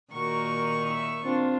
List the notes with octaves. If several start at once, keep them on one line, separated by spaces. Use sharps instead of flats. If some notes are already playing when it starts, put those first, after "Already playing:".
A#2 D#3 F#4 A#4 C#6
E5
C4 D4 F4